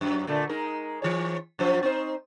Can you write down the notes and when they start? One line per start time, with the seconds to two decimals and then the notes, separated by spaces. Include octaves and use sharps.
0.01 F#2 F#3
0.27 A#2 D3 A3
0.49 G#3 D#4 A#4
1.02 E3 G#4 C#5
1.59 F#2 F3 C5
1.83 C4 D#4 C5